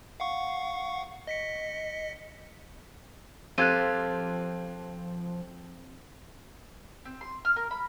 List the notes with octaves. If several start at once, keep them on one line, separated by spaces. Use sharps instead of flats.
F5 F#5 C#6
D#5 B6 C#7
F3 C4 F4 G4 A4 F#6 G#6 D#7
C4
C6
F6
A#4
B5